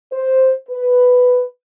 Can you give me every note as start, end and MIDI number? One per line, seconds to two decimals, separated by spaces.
0.11 0.51 72
0.69 1.42 71